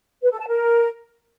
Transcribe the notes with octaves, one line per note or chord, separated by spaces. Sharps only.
B4
A4
A5
A#4